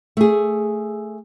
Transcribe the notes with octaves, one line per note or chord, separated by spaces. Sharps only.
A3 G#4